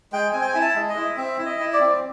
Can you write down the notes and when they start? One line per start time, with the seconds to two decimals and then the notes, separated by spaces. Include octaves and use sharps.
0.13 G#3 G5
0.33 C4 G#5
0.41 G5
0.49 G#5
0.55 E4
0.61 A5
0.75 G#3
0.89 D#5
0.96 E4
1.17 C4 E5
1.38 E4
1.46 D#5
1.59 E4
1.73 D5
1.80 C4